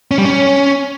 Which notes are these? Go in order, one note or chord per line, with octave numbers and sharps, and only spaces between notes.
C#4
G3
C#4